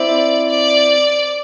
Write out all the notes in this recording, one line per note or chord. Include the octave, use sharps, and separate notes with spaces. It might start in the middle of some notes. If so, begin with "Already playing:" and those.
Already playing: C4 E4 D5
D5